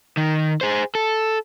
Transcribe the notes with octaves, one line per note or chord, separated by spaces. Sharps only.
D#3
G#4 C5
A4